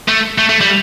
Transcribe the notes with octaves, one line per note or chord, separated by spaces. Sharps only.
A3
A3
A3
G3